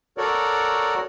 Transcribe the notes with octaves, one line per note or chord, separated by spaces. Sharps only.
F#4 A4 A#4 C#5 D5